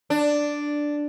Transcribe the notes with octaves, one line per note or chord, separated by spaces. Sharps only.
D4